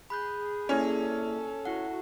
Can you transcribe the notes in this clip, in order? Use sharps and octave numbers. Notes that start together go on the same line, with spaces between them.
G#4 B5 F#6 G6
A#3 C#4 E4 A4 D5
E4 F#4 F#5